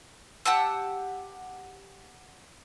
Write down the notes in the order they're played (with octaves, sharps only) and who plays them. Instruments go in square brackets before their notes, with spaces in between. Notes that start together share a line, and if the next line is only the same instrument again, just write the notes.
[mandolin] G4 F#5 A5 E6